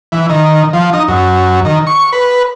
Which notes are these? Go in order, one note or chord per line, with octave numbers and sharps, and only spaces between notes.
E3
D#3
F3
D#4
F#2
D#3
C#6
B4